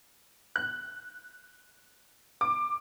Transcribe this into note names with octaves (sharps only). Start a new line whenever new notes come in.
F#6
D6